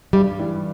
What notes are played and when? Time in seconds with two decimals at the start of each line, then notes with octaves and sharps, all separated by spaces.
0.13 G2 G3
0.39 E3 G3